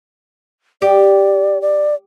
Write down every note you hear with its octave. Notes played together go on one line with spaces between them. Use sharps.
G4 D5
D5